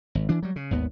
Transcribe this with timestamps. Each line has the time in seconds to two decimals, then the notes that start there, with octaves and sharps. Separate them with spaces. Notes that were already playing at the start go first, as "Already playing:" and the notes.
0.15 G#1
0.29 E3 D4
0.42 F#3 G3
0.56 C#3
0.71 G#1 D#2 B3